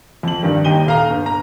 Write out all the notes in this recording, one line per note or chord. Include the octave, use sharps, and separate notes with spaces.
F2 F#7
G2 D#3 G3
D#2 D#4 G4 D#7 G7
D#1 F5 A#5
G1
A#5